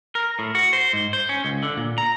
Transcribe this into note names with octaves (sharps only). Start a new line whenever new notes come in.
A#4
A2
F#4
C5
G#2
C5
C#4
C#2
D3
A#2
A#5